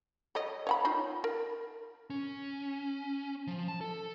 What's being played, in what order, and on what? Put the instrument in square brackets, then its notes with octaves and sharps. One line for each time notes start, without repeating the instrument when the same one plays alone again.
[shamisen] A4 C#5 D#5
C#5 F#5 B5
D#4 F4 B5
A#4
[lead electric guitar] C#4
F3
A5
A4